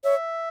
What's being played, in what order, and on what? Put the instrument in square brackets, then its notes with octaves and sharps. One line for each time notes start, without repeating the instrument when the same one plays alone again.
[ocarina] C#5 [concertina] E5